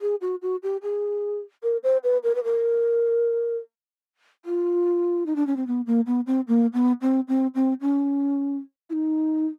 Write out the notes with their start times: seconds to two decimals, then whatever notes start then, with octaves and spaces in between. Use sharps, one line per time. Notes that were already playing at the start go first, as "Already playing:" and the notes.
0.01 G#4
0.21 F#4
0.42 F#4
0.63 G4
0.83 G#4
1.63 A#4
1.83 C5
2.04 B4
2.23 A#4
2.35 B4
2.44 A#4
4.45 F4
5.26 D#4
5.36 D4
5.47 C#4
5.56 C4
5.67 B3
5.86 A#3
6.06 B3
6.27 C4
6.48 A#3
6.73 B3
7.01 C4
7.28 C4
7.55 C4
7.81 C#4
8.90 E4
8.93 D#4